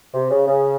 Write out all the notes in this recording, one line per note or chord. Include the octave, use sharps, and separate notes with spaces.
C3
C#3
C#3